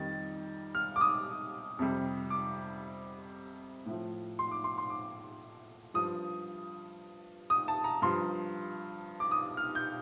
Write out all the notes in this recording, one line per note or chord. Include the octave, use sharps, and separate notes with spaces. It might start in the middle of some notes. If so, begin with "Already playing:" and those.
Already playing: F2 D#3 G3 A6
F6
D6
D#6
F2 C3 G3
D6
A2 F3
C6
D6
C6
C6
D6
G2 F3 D#6
D#6
A5
A#5
G2 F3 C6
D6
D#6
F6
G6